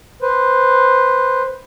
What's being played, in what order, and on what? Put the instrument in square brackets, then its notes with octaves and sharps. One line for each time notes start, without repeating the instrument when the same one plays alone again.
[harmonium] B4 C5